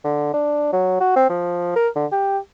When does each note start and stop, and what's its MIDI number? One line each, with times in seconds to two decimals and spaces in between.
0.04 0.33 50
0.34 0.68 62
0.73 1.00 54
1.00 1.15 66
1.16 1.28 60
1.29 1.73 53
1.76 1.88 70
1.96 2.06 50
2.12 2.38 67